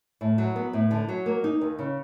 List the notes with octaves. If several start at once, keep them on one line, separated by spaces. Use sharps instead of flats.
A2
F#3
B3
A2
D3
F#3
A#3
D#4
D#2
C#3